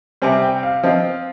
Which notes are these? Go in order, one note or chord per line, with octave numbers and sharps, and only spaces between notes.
C3 G3 C4 G#5
G5
F5
F3 C4 F4 D#5